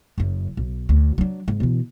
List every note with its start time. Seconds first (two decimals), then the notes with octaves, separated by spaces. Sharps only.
0.18 F#1 F#2
0.57 B1
0.89 D2
1.18 F#3 D4
1.48 G#2
1.60 B2 E3